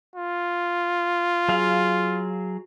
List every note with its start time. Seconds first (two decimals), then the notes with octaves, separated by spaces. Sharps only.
0.16 F4
1.48 F#3 G#4 F5